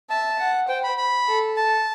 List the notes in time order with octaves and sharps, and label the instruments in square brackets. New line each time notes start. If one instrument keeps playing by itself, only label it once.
[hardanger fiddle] E5 [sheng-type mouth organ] A5
[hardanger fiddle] F#5
[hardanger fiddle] C5 [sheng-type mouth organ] G5
[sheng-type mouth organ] B5
B5
[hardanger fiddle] A4
[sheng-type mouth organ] A5